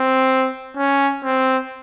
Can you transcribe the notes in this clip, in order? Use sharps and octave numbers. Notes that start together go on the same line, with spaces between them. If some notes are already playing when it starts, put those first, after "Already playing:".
Already playing: C4
C#4
C4